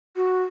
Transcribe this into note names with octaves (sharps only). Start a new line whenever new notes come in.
F#4